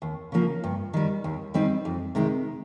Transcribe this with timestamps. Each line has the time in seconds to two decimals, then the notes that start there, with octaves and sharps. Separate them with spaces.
0.02 D#2
0.32 C#3 F3 A#3
0.64 G2
0.94 D#3 G3
1.24 D#2
1.54 D#3 G3 C4 D#4
1.85 F2
2.15 C3 D#3 G#3 D#4